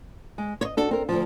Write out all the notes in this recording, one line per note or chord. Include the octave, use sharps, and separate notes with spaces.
G#3
C#5 D#5
D4 F#4 A4
C4 A#4
D2 F3